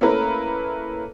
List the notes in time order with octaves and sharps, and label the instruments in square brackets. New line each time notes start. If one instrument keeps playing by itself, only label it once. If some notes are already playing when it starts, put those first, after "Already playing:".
[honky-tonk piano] A3 A#3 C#4 E4 A#4 B4